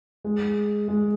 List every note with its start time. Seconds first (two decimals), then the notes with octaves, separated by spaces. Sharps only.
0.24 G#3
0.88 G#3